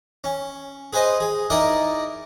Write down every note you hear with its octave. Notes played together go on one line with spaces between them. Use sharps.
C#4
G#4 B4 C5 D#5
G#4
D#4 E4 A#4 D5 D#5